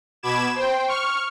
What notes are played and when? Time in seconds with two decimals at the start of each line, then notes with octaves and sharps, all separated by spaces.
0.23 B2 B5 D6 G#6 E7
0.55 C5 G5
0.88 C#6 F6